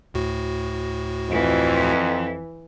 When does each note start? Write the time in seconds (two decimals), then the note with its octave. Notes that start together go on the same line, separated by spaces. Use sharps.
0.14 D2 A2 F#4
1.30 F2 E3